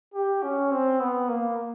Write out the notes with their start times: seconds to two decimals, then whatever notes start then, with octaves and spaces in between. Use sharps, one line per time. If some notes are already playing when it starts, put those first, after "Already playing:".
0.14 G4
0.43 C#4
0.71 C4
1.00 B3
1.29 A#3